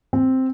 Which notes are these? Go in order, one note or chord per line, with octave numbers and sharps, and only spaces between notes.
C4